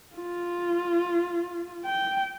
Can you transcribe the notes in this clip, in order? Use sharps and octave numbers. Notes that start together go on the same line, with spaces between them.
F4
G5